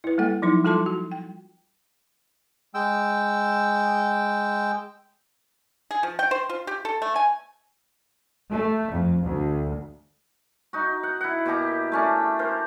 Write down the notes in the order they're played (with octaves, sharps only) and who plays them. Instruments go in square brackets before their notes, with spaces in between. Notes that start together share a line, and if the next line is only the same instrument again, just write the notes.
[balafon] E4 B4
G3 A#3 A4 F#5
F3 F#3 D#4 E4 C6
G3 F4 A4 A5 C6 D6
F#4
G5
[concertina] G#3 G5 E6
[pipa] G#4
F3
G5
C5
F4
G4
A4
A3
G#5
[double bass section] A3
F2
D2
[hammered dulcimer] D#4 F#4
F#5
E4 F#5
B2 A#3 G4 A#5
A3 C#4 D4
A#4 C5